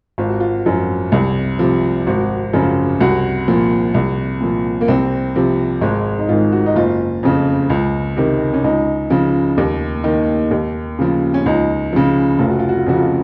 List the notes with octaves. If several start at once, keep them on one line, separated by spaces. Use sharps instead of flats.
G#1 F4
F#4
F4
F#2 F3
C2
C3 F3
G#1 F#4
F#2 C#3 F3
C2 F#4
A#2 F3
C2
A#2 F3
A#3
C2 C4
C3 F3
G#1 G#3
D#4
G#2 D#3 F4
F#4
D#4
F#1 F4
F2 C#3
C#2
C3 D#3
C#4
C#2 D#4
C#3 F3
D#2
D#3
D#2
C#3 F3
C#4
C#2 D#4
C#3 F3
F1 F4
F#4
F4
F#4
F4
F2 C#3 F3 F#4
F4